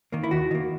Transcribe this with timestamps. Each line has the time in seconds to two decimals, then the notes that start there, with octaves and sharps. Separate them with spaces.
0.12 D#3 A#3
0.23 E4
0.31 D#2 F#4
0.51 D#3 A#3